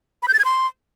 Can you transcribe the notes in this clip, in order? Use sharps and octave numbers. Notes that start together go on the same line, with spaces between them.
B5
G6
A6
G#6
C6